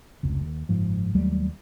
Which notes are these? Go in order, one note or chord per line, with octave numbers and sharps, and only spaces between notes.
F1 C#2
D#2
F#1 G#2 F3
D#2 F#3 G3 A3